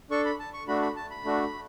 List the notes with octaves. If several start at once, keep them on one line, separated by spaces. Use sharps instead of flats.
D4 A4 C#6
B5
A5
C#6
A3 D4 F#4 B5
B5
A5
B5
A3 D4 F#4